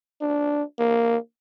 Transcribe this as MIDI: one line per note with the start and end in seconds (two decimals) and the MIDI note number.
0.21 0.63 62
0.79 1.17 58